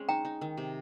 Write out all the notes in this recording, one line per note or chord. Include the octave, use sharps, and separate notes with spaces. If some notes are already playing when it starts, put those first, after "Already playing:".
Already playing: G#3 C4 C#4
D#4 G5 A#5
D#4
D#3
C3